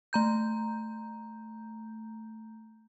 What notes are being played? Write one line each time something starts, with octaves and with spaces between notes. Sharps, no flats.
A3 A#5 G6